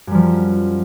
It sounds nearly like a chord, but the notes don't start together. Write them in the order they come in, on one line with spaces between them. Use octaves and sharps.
F#2 G3 F3